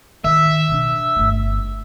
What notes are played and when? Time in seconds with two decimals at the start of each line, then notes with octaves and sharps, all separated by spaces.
0.24 D#3 E5
0.68 B2 D4
1.16 G1 A3